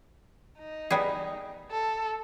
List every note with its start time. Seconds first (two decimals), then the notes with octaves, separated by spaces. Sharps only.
0.59 D#4
0.91 G3 B3 G#4
1.71 A4